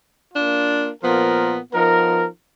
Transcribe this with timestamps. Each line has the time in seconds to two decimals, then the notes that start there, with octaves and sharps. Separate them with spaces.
0.34 A#3 D4 F4
1.03 A#2 F3 B3 F4 A#4
1.71 F3 B3 D#4 A#4